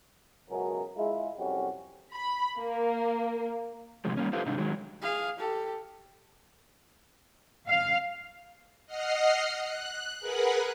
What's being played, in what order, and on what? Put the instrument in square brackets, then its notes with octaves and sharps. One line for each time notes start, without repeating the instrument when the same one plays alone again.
[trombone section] C#2 F#2 B2 F#3 G#4 A#4
G#3 E4 F4
C2 F2 F#3 G3 C#4 F#4
[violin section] B5
A#3
[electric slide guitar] A2 C3 F3 F#3 G#3
G3 A#3 C#4
F4 G4 A4 B4 C5 F5
G#2 C3 D4 D#4
D#3 F#3 G#3
[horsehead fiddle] G#4 F5
G4 A4
[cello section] F5
[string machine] D#5 F#5 F6 C7
F#6
G#4 A#4 B4 F#5 F#6